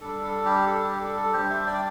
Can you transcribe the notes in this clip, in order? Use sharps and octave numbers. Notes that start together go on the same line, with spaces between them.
G3 D4 A4
A4
G4
A4
G4
A4
A4
G3 D4 G4 C5
C5 E5
D5 G5